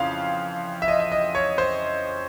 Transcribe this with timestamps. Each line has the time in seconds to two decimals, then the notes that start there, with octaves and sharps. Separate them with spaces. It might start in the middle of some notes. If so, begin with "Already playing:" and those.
Already playing: F2 C#3 E3 F5
0.82 E5
0.88 D#5
1.00 E5
1.12 D#5
1.35 C#5
1.58 C5